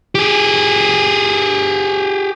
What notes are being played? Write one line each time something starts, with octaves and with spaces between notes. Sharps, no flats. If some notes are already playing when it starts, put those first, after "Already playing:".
G4 G#4